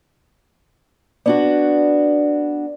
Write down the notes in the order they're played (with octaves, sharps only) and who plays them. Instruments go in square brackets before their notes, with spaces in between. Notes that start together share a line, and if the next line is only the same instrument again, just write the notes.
[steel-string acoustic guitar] B3 D4 F#4 [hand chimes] D5